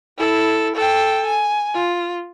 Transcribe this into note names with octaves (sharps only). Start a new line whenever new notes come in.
E4 A4
A4 G5
G#5
F4